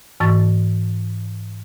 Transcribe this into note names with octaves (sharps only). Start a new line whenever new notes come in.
G#2 E3 C#6 A6